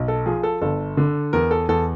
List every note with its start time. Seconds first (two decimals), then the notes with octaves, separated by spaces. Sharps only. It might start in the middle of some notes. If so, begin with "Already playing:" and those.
Already playing: B1
0.08 A4
0.26 F3 G#4
0.43 A4
0.61 G1 A4
0.97 D3
1.33 E2 A#4
1.51 A4
1.69 E2 A4